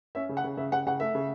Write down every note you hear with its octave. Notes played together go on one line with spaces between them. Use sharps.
C#4 E5
C#3
F#5
C#3
C#3 E5
C#3 F#5
C#3 F#5
A3 E5
C#3